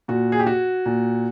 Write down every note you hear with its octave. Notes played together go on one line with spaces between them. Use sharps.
A#2 F#4
G#4
G4
F#4
A#2